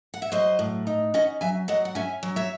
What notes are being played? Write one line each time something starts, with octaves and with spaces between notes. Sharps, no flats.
F#5
E5
F#3 C5 D#5
A2
D#4
C#4 D#5 F#5
F#3 E5 G#5
F#3 D#5 F#5
F#5
C#4 E5 G#5
F#3
C#5 E5